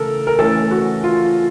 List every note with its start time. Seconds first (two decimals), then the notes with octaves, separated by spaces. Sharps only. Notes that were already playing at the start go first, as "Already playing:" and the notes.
Already playing: C#3 E3 A3 A4 A#4
0.27 A#4
0.38 E3 A3 C#4 A4
0.71 F#4
1.04 F4